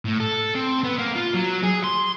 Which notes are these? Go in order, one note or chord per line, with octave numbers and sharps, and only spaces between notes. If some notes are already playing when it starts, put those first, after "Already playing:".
A2
A4
C4
B3
A#3
F4
F#3
G#4
C6